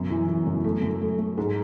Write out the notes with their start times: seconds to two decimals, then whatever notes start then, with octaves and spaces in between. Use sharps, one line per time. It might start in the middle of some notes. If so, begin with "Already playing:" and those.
Already playing: F#2 B2
0.10 E3
0.28 E3
0.47 F#2
0.64 A3
0.82 F#2
1.02 A3
1.19 A3
1.37 G#2